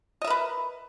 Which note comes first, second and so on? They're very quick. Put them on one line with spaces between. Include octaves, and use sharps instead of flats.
D#5 E5 A#4 B4